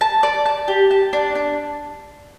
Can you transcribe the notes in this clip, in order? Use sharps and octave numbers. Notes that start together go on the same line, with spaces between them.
A5
D5
A5
G4
A5
D4
D4